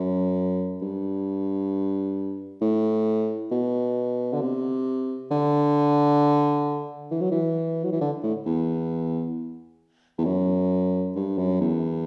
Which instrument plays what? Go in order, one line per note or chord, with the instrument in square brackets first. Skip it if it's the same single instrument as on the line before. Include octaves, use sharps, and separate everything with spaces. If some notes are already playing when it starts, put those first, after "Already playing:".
Already playing: [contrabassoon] F#2
G2
A2
B2
D3
C3
D3
E3
F#3
E3
F#3
E3
D3
A2
E2
E2
F#2
G2
F#2
E2